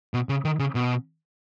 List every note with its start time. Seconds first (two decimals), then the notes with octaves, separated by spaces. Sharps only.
0.14 B2
0.29 C#3
0.45 D#3
0.59 C#3
0.75 B2